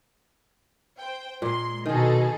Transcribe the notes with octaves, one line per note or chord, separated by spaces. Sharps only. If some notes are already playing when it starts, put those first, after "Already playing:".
C5 G5
A#2 G#3 C6
B2 D#3 D#4 G#4 A4